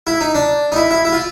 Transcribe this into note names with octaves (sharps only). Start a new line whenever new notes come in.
E4
D#4
D4
D#4
E4
E4
E4
F4